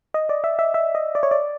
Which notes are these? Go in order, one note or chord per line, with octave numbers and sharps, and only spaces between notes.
D#5
D5
E5
E5
E5
D#5
D5
C#5
D5